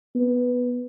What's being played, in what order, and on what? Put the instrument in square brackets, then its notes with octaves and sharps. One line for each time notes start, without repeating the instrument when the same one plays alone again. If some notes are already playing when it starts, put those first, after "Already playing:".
[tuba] B3